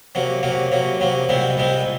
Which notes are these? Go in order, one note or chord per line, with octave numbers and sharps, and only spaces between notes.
C3 F#3 A#3
C3 F#3 A#3
C3 F#3 A#3
C3 F#3 A#3
C2 A#2 G#3 C4
C2 A#2 G#3 C4